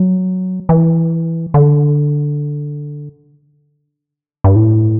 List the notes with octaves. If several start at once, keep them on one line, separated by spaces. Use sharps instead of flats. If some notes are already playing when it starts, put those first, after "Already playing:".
Already playing: F#3
E3
D3
G2
A2